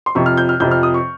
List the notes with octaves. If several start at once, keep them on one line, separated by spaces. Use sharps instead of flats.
C6
F2 C3 F3 C#6
F6
G6
F6
F2 C3 F3 G6
F6
D#6
C#6